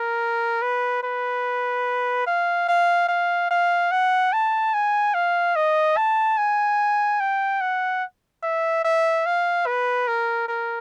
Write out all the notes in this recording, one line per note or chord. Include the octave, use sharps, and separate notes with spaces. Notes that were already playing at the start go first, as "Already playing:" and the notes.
Already playing: A#4
B4
B4
F5
F5
F5
F5
F#5
A5
G#5
F5
D#5
A5
G#5
G5
F#5
E5
E5
F5
B4
A#4
A#4